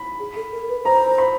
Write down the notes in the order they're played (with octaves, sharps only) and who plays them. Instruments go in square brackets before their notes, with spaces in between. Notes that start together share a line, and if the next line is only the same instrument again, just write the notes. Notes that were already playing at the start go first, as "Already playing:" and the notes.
Already playing: [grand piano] B5
[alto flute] G#4
A4
A#4
B4
[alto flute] C5 [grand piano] A#5
[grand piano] B5